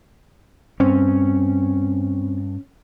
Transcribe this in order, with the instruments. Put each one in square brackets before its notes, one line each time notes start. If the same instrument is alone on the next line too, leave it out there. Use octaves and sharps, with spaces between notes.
[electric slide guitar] G2 [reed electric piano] C4 [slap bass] C#4